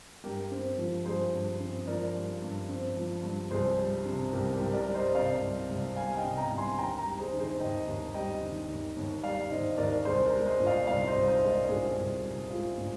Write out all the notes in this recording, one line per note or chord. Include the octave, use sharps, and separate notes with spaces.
G2 G4 A#4
C4
F3
G2 G#4 C5
G2
C4
F3 A#4 D5
G2
G2
C4
F3
G2
C2 G#4 C5
G3
C3
C2 G4 A#4
G4 A#4
C2
A#4 D5
G3
C5 D#5
C3 D5 F5
C2
C2
G3 F5 G#5
D#5 G5
C3
G5 A#5
C2
G#5 C6
D#2 G5 A#5
G5 A#5
G3
G#4 C5
D#3
G#4 C5
D#2 D#5 G5
D#2
G3 D#5 G5
D#3
D#2
D#2
G3 D5 F5
D#3 C5 D#5
D#2 A#4 D5
C2 G#4 C5
A#4 D5
G#3
C5 D#5
A#2
D5 F5
C2 D5 F5
C5 D#5
C2
C5 D#5
G#3
A#4 D5
A#2 G#4 C5
C2
C2
G#3 F4
A#2